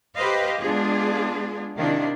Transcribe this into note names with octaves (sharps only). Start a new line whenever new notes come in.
G4 B4 C5 D#5 F5
G#3 B3 D4 F4 G#4
C3 D#3 D4 E4 F5